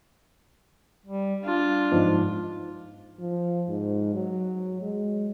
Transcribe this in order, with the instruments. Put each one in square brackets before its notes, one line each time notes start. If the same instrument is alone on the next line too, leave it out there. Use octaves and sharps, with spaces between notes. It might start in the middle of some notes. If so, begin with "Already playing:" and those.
[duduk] G3
[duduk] D4 [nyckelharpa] F4
[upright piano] G#2 F3
[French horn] F3
G#2
F#3
G#3